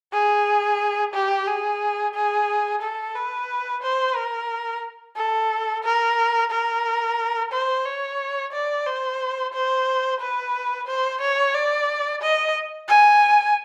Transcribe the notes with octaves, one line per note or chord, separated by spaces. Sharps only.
G#4
G4
G#4
G#4
A4
B4
C5
A#4
A4
A#4
A#4
C5
C#5
D5
C5
C5
B4
C5
C#5
D5
D#5
G#5